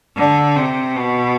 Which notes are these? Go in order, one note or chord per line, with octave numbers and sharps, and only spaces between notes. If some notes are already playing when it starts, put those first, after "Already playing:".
D3
C3
B2